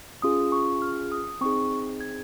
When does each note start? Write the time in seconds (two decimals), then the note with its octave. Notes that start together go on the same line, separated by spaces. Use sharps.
0.22 C#4 F4 G#4 D#6
0.52 C#6
0.82 F6
1.12 D#6
1.41 C4 D#4 G#4 C#6
2.00 G#6